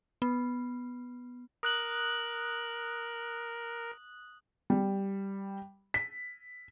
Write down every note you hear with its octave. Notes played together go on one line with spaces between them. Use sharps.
B3
A#4 D#6 F#6 F#7
G3
B6